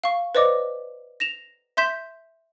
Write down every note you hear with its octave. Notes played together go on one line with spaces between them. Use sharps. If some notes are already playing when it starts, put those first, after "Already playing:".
F5 C#6
B4 C5 D5 D#5 D6
A#6 E7 F7
E5 C6 G6 B6 E7